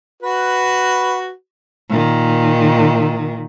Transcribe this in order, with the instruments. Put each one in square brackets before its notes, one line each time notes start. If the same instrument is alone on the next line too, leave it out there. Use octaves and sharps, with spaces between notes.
[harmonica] F#4 B4
[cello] A#2 D#3